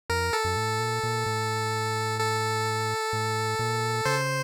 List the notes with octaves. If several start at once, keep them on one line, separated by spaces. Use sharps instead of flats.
F2 A#4
A4
F#2
A2
A#2
A#2
A2
A4
A2
A#2
C#3 C5